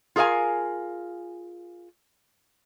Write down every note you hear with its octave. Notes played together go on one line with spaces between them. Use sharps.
F4 G#4 A#4 F5 G#5